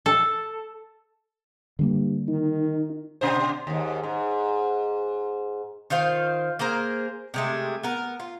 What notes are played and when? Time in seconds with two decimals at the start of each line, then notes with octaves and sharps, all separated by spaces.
0.06 A4
1.79 G2 D3 G3 A#3
2.28 D#3 D#4
3.21 B2 D4 C5
3.67 D#2 G#2
4.03 G#2
5.90 D#3 F4 C5 F5
6.59 A#3 G#4 A#4 C5
7.34 C3 G#3 A3
7.83 B3 A#4
8.20 F4